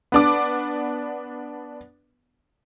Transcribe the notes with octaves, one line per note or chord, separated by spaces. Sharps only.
B3 D4 D6